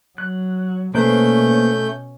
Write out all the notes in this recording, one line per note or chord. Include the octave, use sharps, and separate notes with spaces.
F#3 F#6
B2 A3 A#3 C#4 B4 C5 G6